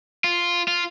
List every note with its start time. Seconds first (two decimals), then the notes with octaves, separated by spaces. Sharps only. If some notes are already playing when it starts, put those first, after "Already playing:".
0.24 F4
0.68 F4